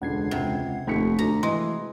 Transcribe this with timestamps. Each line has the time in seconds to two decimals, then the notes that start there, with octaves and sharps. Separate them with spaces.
0.02 E1 C#2 D3 F#5 G#6 C7
0.31 C3
0.87 F1 D#2 A3 B6 C#7
1.19 D2 A#5
1.43 E3 G#3 C6